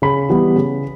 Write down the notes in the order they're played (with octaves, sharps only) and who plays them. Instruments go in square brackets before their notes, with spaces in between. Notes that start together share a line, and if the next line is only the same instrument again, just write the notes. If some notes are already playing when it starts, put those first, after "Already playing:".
[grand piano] C#3 B5
E3 G3 B3
C#3